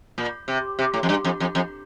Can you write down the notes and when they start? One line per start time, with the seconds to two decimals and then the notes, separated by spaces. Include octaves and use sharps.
0.18 A#2
0.48 C3
0.79 C3
0.94 A2
1.03 F2
1.09 G2
1.24 F2
1.40 F2
1.55 F2